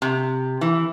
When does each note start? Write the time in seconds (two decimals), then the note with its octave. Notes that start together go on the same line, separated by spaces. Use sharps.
0.02 C3
0.61 E3